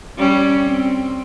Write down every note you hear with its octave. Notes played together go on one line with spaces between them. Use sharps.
G3 C#4
C4